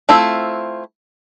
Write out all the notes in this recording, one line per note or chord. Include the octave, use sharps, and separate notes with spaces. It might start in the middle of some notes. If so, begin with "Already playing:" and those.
A3 C4 E4 F4